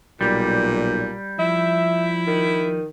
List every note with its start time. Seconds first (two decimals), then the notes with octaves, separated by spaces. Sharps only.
0.21 B1 A#2 G3
1.39 F3 E4 E5
2.27 D#3